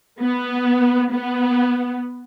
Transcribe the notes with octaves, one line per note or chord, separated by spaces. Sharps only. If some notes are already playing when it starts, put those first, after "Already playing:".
B3
B3